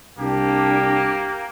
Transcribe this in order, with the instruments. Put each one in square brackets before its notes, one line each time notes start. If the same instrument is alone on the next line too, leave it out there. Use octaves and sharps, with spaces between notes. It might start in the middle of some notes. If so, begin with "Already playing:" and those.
[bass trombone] C2 [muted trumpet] A#3 [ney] D4 [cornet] G4